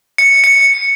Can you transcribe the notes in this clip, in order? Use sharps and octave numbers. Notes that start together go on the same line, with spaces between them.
C#7
C#7